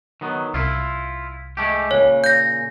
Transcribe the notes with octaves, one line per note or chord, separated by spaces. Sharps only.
D#3 F#3 B3
C2 E4 F4
G#3 A3 G4
A#2 C#3 C#5
G6 A#6